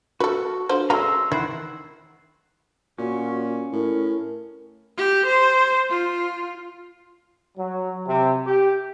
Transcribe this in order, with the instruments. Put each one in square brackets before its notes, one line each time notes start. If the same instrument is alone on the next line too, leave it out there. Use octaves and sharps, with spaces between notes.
[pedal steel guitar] F#4 [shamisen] A4 B4
[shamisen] D3 F3 C5
[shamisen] G#3 A3 C#4 [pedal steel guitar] A#5 C6 E6
[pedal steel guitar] D#3 C5 F#5 [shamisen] E4
[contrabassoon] A#2 [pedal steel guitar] C#4 [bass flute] F#4
[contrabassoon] A2 [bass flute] A#4
[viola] G4
C5
F4
[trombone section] F#3
C3
G4